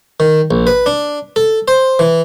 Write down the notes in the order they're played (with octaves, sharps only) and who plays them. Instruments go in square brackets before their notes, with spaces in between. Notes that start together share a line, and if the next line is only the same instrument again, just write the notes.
[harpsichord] D#3
A#1
B4
D4
A4
C5
E3